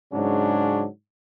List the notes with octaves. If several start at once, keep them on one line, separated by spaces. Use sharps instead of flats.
G#2 C#3 F#3 C#4 D4